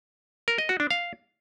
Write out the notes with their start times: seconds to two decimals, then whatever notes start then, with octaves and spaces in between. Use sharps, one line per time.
0.48 A#4
0.58 D#5
0.69 F#4
0.80 D4
0.91 F5